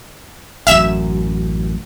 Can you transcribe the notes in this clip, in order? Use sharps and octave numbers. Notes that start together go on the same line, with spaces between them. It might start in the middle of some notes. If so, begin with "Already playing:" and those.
A1 F#2 E5 E7